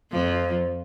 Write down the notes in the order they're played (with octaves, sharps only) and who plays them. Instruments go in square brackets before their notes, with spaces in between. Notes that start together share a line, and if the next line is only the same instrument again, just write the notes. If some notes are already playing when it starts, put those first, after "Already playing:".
[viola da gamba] F2 F3